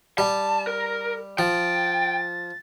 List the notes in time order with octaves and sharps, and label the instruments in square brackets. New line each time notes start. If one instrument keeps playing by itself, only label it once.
[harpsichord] G3 [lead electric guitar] A5
[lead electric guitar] A#4
[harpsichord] F3 [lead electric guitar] G5 [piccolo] A6